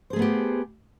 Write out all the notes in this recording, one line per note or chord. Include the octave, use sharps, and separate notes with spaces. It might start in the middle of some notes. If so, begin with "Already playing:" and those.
A3 B3 G4 G#4 C5